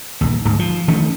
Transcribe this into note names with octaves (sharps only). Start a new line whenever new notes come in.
A#1 D#2
D1 G#2
F3
D#3 F3 A3 C#4